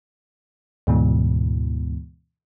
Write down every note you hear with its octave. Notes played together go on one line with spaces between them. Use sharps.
D2 G#2 B2 E3